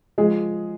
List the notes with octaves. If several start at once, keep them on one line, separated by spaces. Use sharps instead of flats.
F3 G#3 G#4